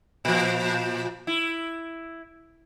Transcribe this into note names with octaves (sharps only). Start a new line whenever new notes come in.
A#2 F3
E4